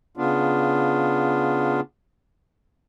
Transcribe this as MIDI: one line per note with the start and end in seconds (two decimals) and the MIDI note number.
0.17 1.80 49
0.17 1.80 59
0.17 1.80 62
0.17 1.80 65